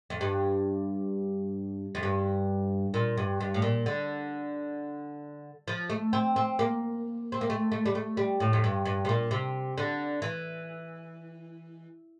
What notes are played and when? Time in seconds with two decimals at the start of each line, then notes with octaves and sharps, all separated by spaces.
0.10 F2
0.21 G2
1.95 F2
2.03 G2
2.94 A#2
3.17 G2
3.40 G2
3.54 A2
3.62 A#2
3.86 D3
5.68 F3
5.90 A3
6.13 C4
6.36 C4
6.59 A#3
7.32 C4
7.41 A#3
7.50 A3
7.72 A3
7.86 G3
7.95 A3
8.17 G3
8.40 A2
8.53 F2
8.64 G2
8.85 G2
9.05 C3
9.09 A#2
9.31 C3
9.78 D3
10.22 E3